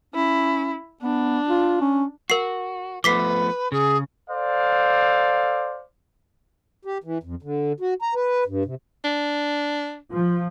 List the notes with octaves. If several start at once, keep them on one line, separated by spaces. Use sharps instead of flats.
C#4 E4
B3 D4
F4
C#4
F#4 A#4 C7
F3 A3 B3 B4 D6 B6 C7
C#3 G#4
A4 C5 D5 F5
G4
E3
F2
D3
F#4
A#5
B4
G2
C3
D4
F3